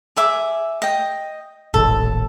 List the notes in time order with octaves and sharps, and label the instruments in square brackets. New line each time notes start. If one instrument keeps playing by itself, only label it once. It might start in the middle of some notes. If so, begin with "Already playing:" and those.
[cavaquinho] G#4 E5 D6
D#5 G5
[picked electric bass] D#1 A1 D#2 [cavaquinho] A4